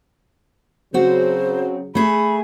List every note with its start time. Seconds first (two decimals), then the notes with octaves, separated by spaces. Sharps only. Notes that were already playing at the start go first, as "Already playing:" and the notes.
0.94 C#3 F#3 C4 F#4 C5
1.95 A3 G#4 B5